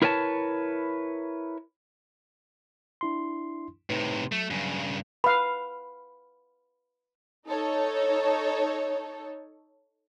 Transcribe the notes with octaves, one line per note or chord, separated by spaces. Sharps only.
E4 A#4 B4 C#5 G#5 A5
D4 E4 C6
A2 C3 D#4 B4
F#3 A3
G2 C#3
B4 F5 B5
D#4 A4 C#5